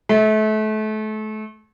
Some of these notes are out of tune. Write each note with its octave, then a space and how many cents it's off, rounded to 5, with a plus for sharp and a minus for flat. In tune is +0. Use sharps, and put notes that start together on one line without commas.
A3 -30